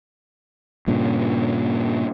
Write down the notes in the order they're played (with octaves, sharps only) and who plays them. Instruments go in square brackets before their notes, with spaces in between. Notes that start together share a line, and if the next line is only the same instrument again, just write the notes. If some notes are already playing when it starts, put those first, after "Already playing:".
[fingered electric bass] G2 A#2 C#3